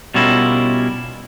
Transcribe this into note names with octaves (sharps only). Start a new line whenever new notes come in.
B2 G3 C#4 E4 F4 A#4